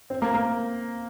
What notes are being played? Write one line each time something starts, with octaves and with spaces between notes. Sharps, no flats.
C4
A#3
A#3